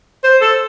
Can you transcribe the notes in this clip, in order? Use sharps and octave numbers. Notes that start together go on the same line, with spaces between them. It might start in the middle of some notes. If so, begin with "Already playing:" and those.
C5
A4